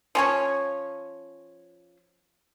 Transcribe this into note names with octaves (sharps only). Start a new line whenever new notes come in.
F3 C#4 C#5